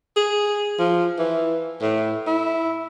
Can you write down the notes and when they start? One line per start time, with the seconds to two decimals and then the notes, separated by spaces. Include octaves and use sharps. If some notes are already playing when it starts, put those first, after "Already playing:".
0.16 G#4
0.79 F3
1.18 E3
1.81 A2
2.27 E4